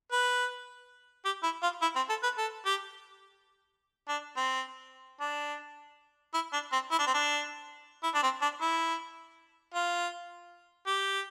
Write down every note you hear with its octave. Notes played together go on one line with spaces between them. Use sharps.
B4
G4
E4
F4
E4
C4
A4
B4
A4
G4
D4
C4
D4
E4
D4
C4
E4
D4
C4
D4
E4
D4
C4
D4
E4
F4
G4